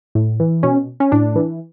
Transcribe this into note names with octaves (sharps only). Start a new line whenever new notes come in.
A2
E3
B2 C#4
C#4
A2 D4
E3